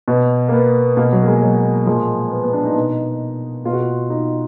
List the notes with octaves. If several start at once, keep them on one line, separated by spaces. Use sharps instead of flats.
B2
A#3
B3
B2 A#3
F#3
A#3
G#3
F#3
A#2 F3 G#3
B3
B3
D4
D#4
B2
B2 F4
F#4
F4
D#4